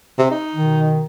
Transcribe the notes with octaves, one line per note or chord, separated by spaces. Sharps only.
C3
D#4
B2 D#3